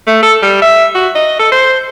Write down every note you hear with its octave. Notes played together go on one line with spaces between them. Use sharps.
A3
A4
G3
E5
F#4
D#5
A4
C5